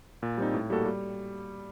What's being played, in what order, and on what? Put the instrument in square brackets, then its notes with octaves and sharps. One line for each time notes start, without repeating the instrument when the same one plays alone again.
[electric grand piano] A#2
G3 C4 D#4
A2
G3 A#3 F#4 A4
G3